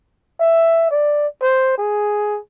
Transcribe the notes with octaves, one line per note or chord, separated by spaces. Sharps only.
E5
D5
C5
G#4